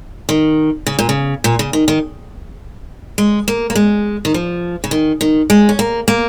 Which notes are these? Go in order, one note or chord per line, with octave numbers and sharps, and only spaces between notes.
D#3
C#3
A#2
C#3
A#2
C#3
D#3
D#3
G#3
A#3
A#3
G#3
D#3
F3
C#3
D#3
D#3
G#3
C#4
A#3
A#3